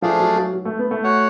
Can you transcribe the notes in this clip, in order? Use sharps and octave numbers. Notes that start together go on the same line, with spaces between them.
F3 A3 D4 G#4 D5 F5
F#3
F#3
F#3
A3
B3
A3
F#4 C#5 F#5